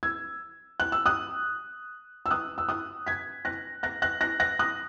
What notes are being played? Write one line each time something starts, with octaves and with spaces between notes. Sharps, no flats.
E6 G#6
F#6
E6
D#6 F#6
E6
D#6 F#6
E6
D#6 F#6
G#6 B6
F#6 A#6
F#6 A#6
F#6 A#6
F#6 A#6
F#6 A#6
D#6 F#6